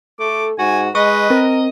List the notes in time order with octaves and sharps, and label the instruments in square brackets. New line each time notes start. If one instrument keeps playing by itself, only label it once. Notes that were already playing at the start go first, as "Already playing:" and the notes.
[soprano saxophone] A3 [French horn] A4 [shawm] D6
[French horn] G#2 [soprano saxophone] F#4 [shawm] G#5
[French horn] G#3 [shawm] B4 [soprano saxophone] D#5 [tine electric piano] C#6
[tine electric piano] C4 [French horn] A#4